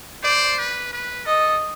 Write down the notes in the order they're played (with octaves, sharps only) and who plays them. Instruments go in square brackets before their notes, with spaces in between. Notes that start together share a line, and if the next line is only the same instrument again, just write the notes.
[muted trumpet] C5 [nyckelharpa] D5
[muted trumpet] B4
B4
[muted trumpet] A4 [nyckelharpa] D#5